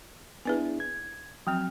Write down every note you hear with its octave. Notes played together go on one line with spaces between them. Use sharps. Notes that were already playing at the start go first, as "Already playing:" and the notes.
B3 D4 E4 G#4 B4 G#5
G#6
F3 F#3 C4 G5 F6